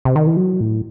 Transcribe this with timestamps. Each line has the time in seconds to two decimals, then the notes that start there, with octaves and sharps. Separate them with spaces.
0.05 C3
0.16 D#3
0.27 E3
0.37 F#3
0.61 A2